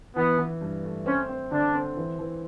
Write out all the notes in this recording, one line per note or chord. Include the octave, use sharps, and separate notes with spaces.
E3 B3
E3
G2
A3
C4 C#4
C4
D3 D4
C4
E3
E3